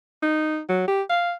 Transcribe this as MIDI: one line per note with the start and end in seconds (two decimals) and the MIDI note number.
0.22 0.60 63
0.69 0.87 54
0.88 1.02 67
1.10 1.33 77